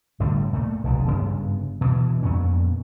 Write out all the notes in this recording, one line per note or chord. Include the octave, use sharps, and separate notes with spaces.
G1 A2 D3 G3
A#2 A3
F1 B1 D3
F#1 G2 C#3 B3
B2 E3
F2 A#2 B3 C#4